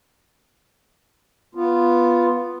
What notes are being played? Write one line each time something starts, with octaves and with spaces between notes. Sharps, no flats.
B3 F4